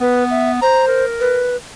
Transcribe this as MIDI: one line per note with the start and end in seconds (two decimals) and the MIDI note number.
0.01 0.59 59
0.01 0.24 71
0.30 0.51 76
0.62 1.05 72
0.62 0.86 82
0.88 1.46 70
1.20 1.56 71